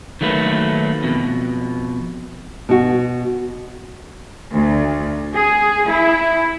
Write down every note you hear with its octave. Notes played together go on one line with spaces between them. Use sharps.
D#3 F#3 A3 A#3 B4
F2 B2
B2 F#4
D2
G#4
E4